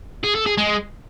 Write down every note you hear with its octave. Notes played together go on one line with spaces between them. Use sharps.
G#4
A4
G#4
G#3